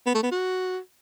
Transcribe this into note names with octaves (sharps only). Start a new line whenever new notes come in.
B3
A3
B3
F#4